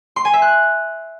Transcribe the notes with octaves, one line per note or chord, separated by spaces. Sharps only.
C6
G#5
E5
F#6